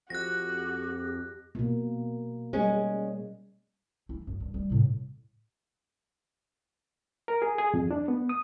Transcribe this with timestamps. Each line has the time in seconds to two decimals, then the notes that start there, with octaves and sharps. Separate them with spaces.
0.10 F2 F#4 G4 F#6 A#6
1.55 B2 A#3
2.53 G3 G#3 C#4
4.09 E4
4.27 F#2
4.40 G2
4.54 G3
4.70 A2 C3
7.28 A#4
7.42 G#4
7.58 G#4
7.74 F2
7.91 D4
8.08 B3
8.29 D#6